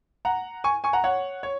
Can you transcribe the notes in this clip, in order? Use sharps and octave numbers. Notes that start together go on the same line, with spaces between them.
F#5 A#5
G#5 C#6
G#5 C#6
F#5 A#5
C#5 F#5
C#5